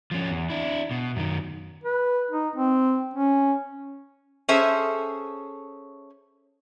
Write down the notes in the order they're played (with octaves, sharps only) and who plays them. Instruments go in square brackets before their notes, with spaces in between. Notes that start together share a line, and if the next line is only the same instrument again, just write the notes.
[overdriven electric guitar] F3 C#4
E2
D4 E4
B2
F#2 D#3
[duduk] B4
D#4
C4
C#4
[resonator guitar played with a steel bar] C#4 G#4 A4 C5 E5